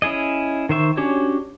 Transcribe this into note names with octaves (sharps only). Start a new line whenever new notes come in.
C#4 E4 G#4 D#5
D#3 C5 E5 C#6
C#4 D4 F#4 G4 C#5